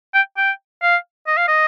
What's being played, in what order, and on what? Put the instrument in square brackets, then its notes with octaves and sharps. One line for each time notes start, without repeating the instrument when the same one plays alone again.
[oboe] G5
G5
F5
D#5
F5
D#5